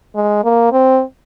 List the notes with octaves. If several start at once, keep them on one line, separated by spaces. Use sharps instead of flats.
G#3
A#3
C4